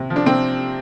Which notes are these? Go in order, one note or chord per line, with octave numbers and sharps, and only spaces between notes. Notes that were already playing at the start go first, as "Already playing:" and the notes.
Already playing: C3
F3
D4
C3 C4